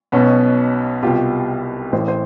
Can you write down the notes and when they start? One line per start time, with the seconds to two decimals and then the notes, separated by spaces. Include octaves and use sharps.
0.12 B1 B2 B3 C#4
1.02 C2 B2 F4 G4
1.92 A1 A2 E3 A#4 C5
2.08 C5